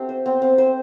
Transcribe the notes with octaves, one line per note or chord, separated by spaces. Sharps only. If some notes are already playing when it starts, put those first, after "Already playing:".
Already playing: A3 C4 G4
C5
C4
C4
C5